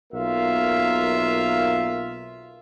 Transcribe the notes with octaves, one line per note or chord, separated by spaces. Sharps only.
B1 A#3 F4 A#4 E5 F5